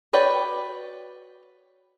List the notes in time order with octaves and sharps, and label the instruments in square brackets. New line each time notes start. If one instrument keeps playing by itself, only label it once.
[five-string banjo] F#4 B4 C#5 D5 G5